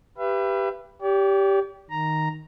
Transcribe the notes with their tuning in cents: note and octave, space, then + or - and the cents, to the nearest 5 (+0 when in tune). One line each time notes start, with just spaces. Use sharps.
G4 +5 B4 +0 E5 +40
G4 +0 D5 -45
D#3 +0 A#5 +0